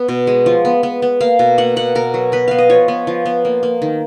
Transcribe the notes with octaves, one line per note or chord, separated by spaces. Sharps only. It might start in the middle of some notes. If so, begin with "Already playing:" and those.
Already playing: B3
B2
G#3
F3
B3
B3
B3
A#3 F5
B2
A#3 F#5
B2 F#5
B2 A#4
F#3
B3 B4
B3 F5
D#5
F3 C#5
B3
F3
B3
A#3
A#3
D#3